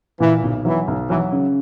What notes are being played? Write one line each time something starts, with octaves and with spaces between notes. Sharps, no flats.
A#2 E3
B1
E3 F#3
B1
E3 F#3
C#3